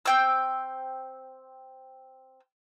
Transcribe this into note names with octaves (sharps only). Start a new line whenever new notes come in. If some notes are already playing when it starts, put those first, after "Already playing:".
C4 G5 E6